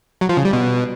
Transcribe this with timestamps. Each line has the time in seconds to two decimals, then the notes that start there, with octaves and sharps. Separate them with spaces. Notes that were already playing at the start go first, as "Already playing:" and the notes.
0.21 F#3
0.29 F3
0.37 C#3
0.45 G3
0.53 B2